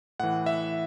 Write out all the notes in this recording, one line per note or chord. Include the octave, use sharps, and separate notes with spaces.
A2 E3 F#5
E5